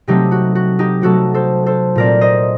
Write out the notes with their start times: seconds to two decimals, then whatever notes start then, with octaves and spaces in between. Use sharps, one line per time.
0.07 C3 F#3 A3 C4 D#4 G4
0.31 F#4
0.55 F#4
0.79 D#4 G4
1.02 C3 F#3 A3 C4 F#4 A4
1.34 A4 C5
1.66 A4 C5
1.95 A#2 A3 C4 A#4 D5
2.21 C5 D#5